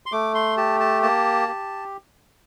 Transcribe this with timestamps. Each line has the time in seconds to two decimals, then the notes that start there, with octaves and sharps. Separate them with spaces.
0.06 C6
0.12 A3 D6
0.35 C6
0.57 G4 A5
0.80 A5
1.03 A#3 A5
1.48 G4